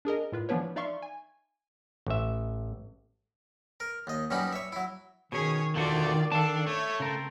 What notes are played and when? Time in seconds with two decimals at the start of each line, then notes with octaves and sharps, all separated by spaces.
0.05 D4 G#4 A#4 D#5
0.32 A2 F4 B4
0.49 E3 F3 B3 D4 B4 C#5
0.76 D#4 D5 E5 F5 C6 C#6
1.02 G#5
2.07 A1 E5
3.80 A#4
4.07 D#2 D#5
4.31 F#2 B2 G3 C#4 D#4 B5
4.53 C#5 E5
4.72 F#3 E4
5.32 B2 D#3 C#4 G#4 C#5
5.75 E2 B2 D3 A3 F4 F#4 D5
6.32 D4 A4 F5 A5
6.66 A3 C#5
7.00 C#3 C4 A#4